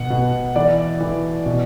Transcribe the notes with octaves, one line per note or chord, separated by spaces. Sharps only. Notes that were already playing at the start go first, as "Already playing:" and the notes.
Already playing: B2 F#5
B2
E3 D5
E3
B2